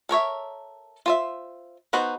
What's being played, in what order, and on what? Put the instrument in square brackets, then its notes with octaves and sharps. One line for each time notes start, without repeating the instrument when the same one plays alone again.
[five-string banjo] A4 A#4 C#5 E5
F4 C5 E5
B3 D#4 F#4 B4 C5